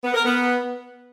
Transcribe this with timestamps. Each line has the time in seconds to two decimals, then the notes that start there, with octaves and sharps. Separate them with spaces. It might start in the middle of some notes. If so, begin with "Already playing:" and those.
0.04 B3
0.14 A#4
0.25 B3